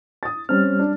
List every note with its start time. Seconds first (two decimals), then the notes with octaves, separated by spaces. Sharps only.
0.23 D#6 A6
0.49 G3 C4 C#4 F6
0.79 D4